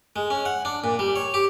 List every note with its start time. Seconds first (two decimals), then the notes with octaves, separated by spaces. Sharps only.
0.16 G#3
0.30 C#4
0.45 F#5
0.65 D4
0.84 A#2
0.99 G3
1.16 C#5
1.34 G4